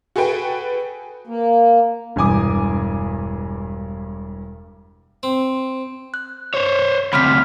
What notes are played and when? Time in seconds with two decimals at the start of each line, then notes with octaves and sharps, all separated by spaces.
0.16 F#4 G#4 A4 B4 G5
1.27 A#3
2.16 E1 G2 E3 G#5 D6 D#6
5.23 C4
6.14 F#6
6.54 C5 C#5
7.13 D2 C3 B5 F6 B6